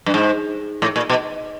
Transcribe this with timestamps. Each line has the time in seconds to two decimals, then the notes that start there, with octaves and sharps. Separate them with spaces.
0.06 G2
0.14 G#2
0.82 A2
0.96 A#2
1.10 B2